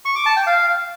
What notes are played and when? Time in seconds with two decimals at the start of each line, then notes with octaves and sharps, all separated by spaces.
0.05 C#6
0.16 D6
0.26 A5
0.36 G5
0.47 F5